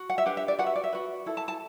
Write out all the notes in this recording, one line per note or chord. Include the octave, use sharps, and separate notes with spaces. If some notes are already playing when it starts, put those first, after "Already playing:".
Already playing: F#4
F#5
E5
D4 G4 B4 F#5
E5
D5
F#4 B4 F#5
E5
D5
E5
F#4 B4
E4 A4
A5
A5